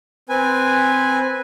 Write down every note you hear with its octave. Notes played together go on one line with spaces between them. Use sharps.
C4 B4 G#5